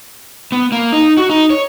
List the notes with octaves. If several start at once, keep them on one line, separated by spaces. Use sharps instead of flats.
B3
A#3
D#4
F#4
D#4
C#5